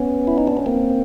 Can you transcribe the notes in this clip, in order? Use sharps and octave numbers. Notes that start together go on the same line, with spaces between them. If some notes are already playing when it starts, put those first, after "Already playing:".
Already playing: B3 C#4
E4
D#4
D4
C#4
A#3 C4